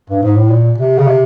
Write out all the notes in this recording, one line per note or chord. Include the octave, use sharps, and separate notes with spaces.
G2
G#2
A2
A#2
C3
C#3
C3